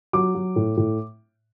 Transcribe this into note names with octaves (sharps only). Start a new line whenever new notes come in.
F#3 D6
F#3
A2
A2